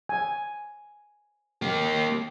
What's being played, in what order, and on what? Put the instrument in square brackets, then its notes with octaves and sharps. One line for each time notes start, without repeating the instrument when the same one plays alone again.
[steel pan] G#5
[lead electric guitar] A#3 G4